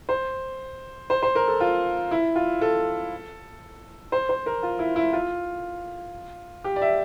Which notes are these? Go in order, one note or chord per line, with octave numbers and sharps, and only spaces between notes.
C5
C5
C5
A#4
A4
F4
E4
F4
A4
C5
C5
A#4
F4
E4
E4
F4
G4
D5
E5